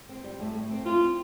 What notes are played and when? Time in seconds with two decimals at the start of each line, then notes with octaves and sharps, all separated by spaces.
0.09 C4
0.24 G3
0.40 A2
0.55 A2
0.71 C4
0.86 C4 F4
1.01 C4